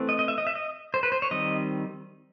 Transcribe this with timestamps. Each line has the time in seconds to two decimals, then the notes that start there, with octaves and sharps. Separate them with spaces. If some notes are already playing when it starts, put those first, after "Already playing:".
Already playing: E3 A3 C4
0.09 D#5
0.19 D#5
0.28 E5
0.38 D#5
0.47 E5
0.55 D#5
0.94 C5
1.03 B4
1.12 C5
1.22 C#5
1.31 D#3 G3 C4 D#5